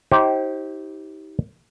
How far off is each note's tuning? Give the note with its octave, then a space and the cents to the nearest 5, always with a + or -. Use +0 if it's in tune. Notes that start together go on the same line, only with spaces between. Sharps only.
D#4 +35 G4 -15 C5 +30